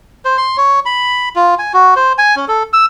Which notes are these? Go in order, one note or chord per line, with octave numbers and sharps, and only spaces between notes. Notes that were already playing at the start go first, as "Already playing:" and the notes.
C5
C6
C#5
B5
F4
G#5
F#4
C5
G#5
C#4
A4
E6